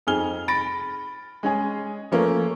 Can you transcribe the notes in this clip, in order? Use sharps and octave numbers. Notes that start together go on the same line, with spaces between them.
F2 D#4 G#4 F6 G7
B5 A6 A#6 D7
G#3 C#4 G#4
F3 A3 A#3 C#4